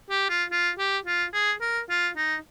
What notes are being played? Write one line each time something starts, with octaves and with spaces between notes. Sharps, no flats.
G4
F4
F4
G4
F4
G#4
A#4
F4
D#4